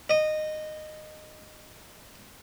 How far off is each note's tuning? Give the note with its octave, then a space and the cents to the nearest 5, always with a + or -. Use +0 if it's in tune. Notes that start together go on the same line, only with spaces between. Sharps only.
D#5 -15